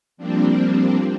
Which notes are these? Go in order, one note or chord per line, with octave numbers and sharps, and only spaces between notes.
F3 G3 A#3 C4 D4